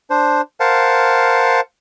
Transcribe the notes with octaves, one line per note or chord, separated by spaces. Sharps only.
D4 C5
A#4 C5 F5 F#5 A5